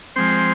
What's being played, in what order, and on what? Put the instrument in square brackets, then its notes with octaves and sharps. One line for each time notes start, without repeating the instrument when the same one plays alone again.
[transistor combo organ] F3 G#3 C4 C5